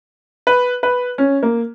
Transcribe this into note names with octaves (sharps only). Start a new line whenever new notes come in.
B4
B4
C#4
A#3